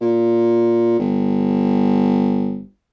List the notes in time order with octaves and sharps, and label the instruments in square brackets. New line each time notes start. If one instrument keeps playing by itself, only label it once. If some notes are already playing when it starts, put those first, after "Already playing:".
[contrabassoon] A#2
G1